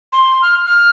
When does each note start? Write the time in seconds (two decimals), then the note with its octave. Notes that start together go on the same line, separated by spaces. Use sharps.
0.13 C6
0.42 F6
0.67 F6